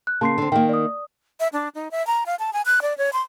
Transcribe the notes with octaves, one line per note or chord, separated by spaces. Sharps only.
F#6
C#3 A#3 A5 C6 C7
D3 C4
D#3 A#3 G5
D5 D#6
E5
D4
D#4
E5
A#5
F5
A5
G#5
F#6
D5
C#5
C6